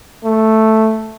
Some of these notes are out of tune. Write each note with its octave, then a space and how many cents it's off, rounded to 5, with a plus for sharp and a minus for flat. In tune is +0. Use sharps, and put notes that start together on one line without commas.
A3 +0